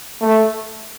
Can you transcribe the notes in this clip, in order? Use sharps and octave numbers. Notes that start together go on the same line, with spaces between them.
A3